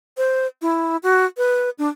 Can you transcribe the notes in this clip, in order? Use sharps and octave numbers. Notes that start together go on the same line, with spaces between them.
C5
E4
F#4
B4
D4